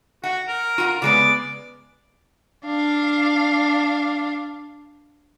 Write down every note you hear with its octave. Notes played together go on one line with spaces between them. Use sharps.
F#4 F#5
A#4
F4 F#5 A#5
C#3 G#3 B3 D5
D4 F5